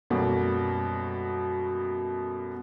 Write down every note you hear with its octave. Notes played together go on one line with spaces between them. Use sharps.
F#2 B2 G3 A3 A#3 F#4